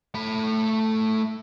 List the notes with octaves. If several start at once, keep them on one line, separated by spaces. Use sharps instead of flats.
A3 B5